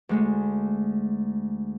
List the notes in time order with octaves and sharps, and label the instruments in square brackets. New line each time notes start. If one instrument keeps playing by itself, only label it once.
[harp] D2 G#3 A3